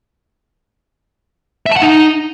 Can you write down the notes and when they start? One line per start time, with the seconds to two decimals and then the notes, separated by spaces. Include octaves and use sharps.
1.66 E5
1.71 A5
1.77 F#5
1.82 D#4